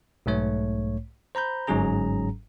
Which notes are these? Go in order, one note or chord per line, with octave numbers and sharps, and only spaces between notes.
B1 G#2 A3 C#5
C5 A#5 B5 G6
G1 G#2 F#3 C#4 G#4 A#5